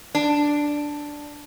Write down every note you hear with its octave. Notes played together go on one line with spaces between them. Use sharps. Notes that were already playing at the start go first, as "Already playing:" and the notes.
D4